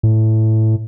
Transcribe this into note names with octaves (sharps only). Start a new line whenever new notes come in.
A2